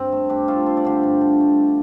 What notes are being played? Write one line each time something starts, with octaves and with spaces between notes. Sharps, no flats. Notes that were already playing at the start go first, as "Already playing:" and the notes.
Already playing: G2 C4
A3
G2 D4 G4
A3 F4 A4
A3 C5
D5
D3 G4 C5
G2
D3
A3